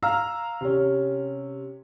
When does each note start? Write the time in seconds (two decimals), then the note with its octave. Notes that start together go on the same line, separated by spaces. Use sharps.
0.02 F5 A#5 E6 F6
0.61 C3 C#4